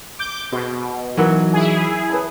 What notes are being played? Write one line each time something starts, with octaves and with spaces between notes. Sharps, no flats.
D6 G6
B2 F#4 G#4 C5
E3 F#3 D#4 F#4 A#4
E4 G#4
B4 C#5 A5